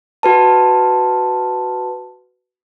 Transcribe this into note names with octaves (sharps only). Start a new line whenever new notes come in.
F#4 B4 A5